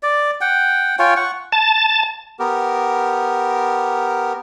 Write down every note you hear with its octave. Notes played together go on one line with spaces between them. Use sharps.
D5
F#5 G5
F4 C#5 G5 G#5
F#5 C#6
A5
B3 G4 A#4